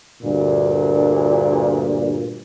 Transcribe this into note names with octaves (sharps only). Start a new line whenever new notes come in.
D2 G2 A#2